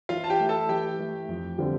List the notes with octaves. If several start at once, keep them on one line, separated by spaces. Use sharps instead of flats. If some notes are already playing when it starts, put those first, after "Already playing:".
E3 F4 F5
A5
G4 G5
A3 E4
A4 A5
E3 G4 G5
A3 E4
F2
D3 G3 C4 F4